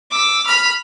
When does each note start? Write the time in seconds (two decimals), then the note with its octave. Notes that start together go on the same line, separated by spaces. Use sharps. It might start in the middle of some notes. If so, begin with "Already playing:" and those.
0.11 D6 E6
0.46 B5 F6